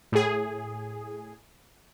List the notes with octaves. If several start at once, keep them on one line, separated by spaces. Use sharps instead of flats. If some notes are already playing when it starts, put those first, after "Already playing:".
A2 G#4